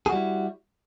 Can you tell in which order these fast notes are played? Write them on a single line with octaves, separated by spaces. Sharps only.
G#4 F#4 G3 E4